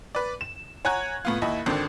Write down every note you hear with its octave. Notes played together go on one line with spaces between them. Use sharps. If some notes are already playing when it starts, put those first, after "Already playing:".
B4 D5
E7
C#5 F#5 G#5 A#5 F#6 G#6
A2 B3 F4
D#2 E4 D#5 B5
G#1 D3 D#3 C4 D4